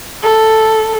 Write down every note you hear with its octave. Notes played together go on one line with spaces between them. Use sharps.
A4